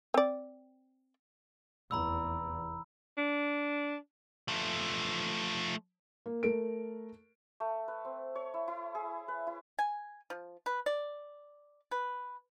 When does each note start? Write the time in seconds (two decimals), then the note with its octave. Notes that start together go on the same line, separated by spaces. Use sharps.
0.14 C4 D5
1.91 F1 E2 A#5 B5 E6
3.17 D4
4.48 F3 A3
6.26 A#3
6.43 A3 A#4 D7
7.60 A3
7.88 B4
8.05 C4
8.35 C#5
8.54 E4
8.68 E4
8.95 G#4
9.28 B4
9.47 E4
9.79 G#5
10.30 F3
10.66 B4
10.86 D5
11.91 B4